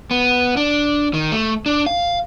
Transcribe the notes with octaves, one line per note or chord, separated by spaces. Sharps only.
B3
D4
D#3
A3
D4
F5